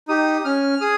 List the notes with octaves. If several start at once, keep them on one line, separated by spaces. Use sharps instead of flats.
D#4 G4 D#6
C#4 F6
G#4 D#6